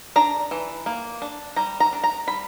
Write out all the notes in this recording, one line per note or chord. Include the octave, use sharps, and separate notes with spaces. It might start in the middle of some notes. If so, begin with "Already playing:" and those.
D4 A#5
E3
A#3
D4
G3 A#5
A#5
D4
A#5
G3 B5